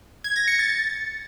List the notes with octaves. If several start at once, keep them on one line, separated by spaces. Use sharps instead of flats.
G#6
A#6
C#7
A6